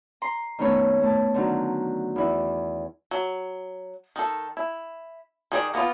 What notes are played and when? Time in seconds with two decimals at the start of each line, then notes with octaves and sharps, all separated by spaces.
0.22 A#5 C6
0.59 D#3 A3 B3 C#4 C#5
1.01 A3 A5
1.34 D3 D#3 F#3
2.16 E2 E4
3.11 F#3
4.16 D#3 A4
4.57 E4
5.52 D#3 G#4 D5
5.73 A#3 B3 D#4 F4